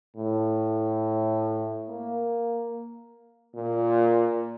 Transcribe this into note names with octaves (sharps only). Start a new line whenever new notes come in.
A2
A#3
A#2